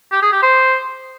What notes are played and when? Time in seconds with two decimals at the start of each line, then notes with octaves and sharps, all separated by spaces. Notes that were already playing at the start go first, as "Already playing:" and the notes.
0.12 G4
0.22 G#4
0.32 G4
0.43 C5